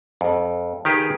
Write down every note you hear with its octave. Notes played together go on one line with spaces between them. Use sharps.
F2
D#3 G4 G#4 B4